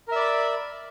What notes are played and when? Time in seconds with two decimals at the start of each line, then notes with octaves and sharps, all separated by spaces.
0.08 A#4
0.12 E5
0.16 D5
0.20 B5